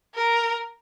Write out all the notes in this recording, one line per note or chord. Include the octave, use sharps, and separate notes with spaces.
A#4